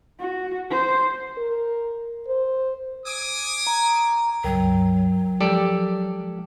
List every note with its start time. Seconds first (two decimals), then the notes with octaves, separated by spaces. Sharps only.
0.19 F#4
0.70 C5
1.37 A#4
2.27 C5
3.05 G#5 D6 D#6
3.67 A#5
4.44 C#2 G2 F#3 A#4 G5
5.41 F3 G#3 G4 A4 D5